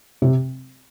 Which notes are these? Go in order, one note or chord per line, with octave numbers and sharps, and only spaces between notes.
C3